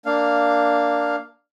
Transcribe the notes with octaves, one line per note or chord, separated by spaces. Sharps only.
A#3 D4 F5